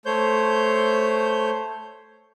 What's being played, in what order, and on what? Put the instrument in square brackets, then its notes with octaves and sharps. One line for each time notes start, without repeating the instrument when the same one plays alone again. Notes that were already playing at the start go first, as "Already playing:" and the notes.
[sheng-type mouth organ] A3 C5 C#5 G6